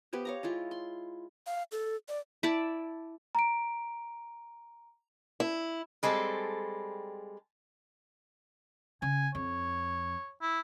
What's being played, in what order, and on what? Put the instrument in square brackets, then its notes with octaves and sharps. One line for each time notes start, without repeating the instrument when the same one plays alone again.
[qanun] B3 G4 B4 C5
C#5 F5 A#5
G#3 E4 F4
C6
[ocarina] F5
A4
D5
[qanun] E4 D5 A5
[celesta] A#5 D7
[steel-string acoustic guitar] E4
[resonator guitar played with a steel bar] G3 G#3 C4 A4
[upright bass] C#3 [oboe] G#5
[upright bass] F2 [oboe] C#5
[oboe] E4